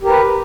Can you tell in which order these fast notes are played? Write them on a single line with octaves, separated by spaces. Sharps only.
G4 A#4 B4